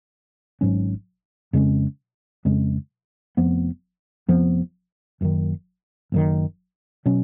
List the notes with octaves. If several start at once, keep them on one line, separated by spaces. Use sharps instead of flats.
G#1 G#2 F#3 C#4
F2 C#3 G#3 C#4
F2 C#3 G#3 C#4
F1 F2 F3 B3
F1 F2 F3 B3
F#1 F#2 D#3
F#1 F#2 D#3
B2 F#3 C#4